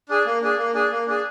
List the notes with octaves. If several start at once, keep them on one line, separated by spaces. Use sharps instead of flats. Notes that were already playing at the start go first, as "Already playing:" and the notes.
D4 G#4
A#3
D4 G#4
A#3
D4 G#4
A#3
D4 G#4